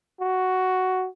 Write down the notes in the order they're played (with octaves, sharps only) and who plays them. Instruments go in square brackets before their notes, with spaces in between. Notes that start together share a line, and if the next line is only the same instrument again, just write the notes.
[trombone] F#4